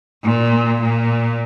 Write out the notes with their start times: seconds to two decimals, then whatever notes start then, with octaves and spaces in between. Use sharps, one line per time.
0.23 A#2
0.81 A#2